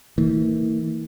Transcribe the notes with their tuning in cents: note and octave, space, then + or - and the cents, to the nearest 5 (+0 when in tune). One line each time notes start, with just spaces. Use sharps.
E3 -35 A#3 -35